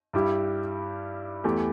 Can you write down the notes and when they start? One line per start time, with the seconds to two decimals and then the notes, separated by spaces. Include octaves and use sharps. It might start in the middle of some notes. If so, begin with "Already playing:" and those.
0.13 G2 G3 E4 G4
1.44 E2 E3 A3 G4